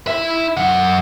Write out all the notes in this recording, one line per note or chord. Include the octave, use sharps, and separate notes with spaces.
E4 E5
F#2 F#5